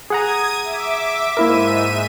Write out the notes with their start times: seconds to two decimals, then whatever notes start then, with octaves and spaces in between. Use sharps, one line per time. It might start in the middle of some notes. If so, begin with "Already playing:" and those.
0.10 G#4 F#5 A#5 D#6 G#6 D#7
0.63 E5 D6
1.37 G#2 A#3 E4 A#4 E5 D#7